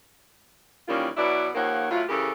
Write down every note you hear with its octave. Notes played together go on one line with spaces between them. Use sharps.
D#3 E3 G3 A#3 C#4 F4
B2 F#3 B3 E4 D5
D#2 D#3 F3 A#3 C#5 F#5
A2 F#3 E4 F4
C#3 E3 C#4 G4 A4 A#4